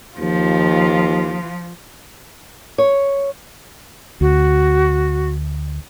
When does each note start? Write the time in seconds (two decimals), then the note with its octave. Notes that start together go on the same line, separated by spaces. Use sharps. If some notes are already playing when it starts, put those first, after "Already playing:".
0.18 D#2 F3 F4
2.78 C#5
4.21 D2 F#4